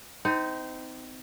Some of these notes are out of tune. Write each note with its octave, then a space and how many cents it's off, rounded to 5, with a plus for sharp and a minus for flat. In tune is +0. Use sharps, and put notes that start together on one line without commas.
C4 -25 D#4 +20